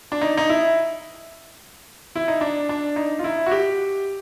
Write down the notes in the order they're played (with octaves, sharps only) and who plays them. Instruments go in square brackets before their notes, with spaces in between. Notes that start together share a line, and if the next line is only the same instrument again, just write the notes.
[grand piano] D4
D#4
D#4
E4
E4
D#4
D4
D4
D#4
F4
E4
F#4
G4